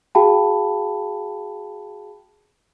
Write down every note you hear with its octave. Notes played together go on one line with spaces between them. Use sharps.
F#4 G#4 F5 G5 A5 B5